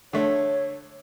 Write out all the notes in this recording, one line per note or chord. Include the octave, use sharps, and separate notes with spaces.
D3 A3 C#5